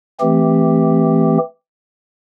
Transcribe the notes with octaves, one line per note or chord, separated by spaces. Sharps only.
E3 A3 C4 G4